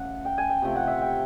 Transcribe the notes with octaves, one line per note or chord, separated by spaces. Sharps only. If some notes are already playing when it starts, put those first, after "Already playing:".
Already playing: C#3 A3 F#5
G5
G#5
G5
C3 F3 A3 G5
F#5
E5
G5